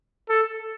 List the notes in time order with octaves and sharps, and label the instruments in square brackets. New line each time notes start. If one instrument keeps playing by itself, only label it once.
[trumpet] A4